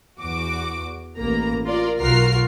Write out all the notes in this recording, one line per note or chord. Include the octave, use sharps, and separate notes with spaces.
E2 F#4 D6
A1 A#3 A#5
F4 A#4 D5
B1 F4 F#4 A#4 F6 C7